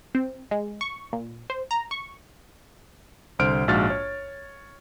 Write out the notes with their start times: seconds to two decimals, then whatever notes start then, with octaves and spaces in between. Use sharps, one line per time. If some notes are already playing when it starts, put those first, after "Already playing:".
0.15 C4
0.51 G#3
0.81 C#6
1.13 A#2
1.50 C5
1.71 A#5
1.91 C#6
3.39 C2 D3 C5 F6 D7
3.68 A#1 G#2 F#4 F5 F6 A6
3.90 C#5